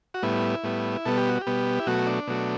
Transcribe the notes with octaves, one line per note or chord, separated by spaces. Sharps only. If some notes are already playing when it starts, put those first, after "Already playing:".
F#4
A2 G3 B3 E4
A2 G3 B3
B2 G3 B3 A4
G4
F#4
G4
B2 G3 B3
E4
B2 F#3 A3 F#4
D4
B2 F#3 A3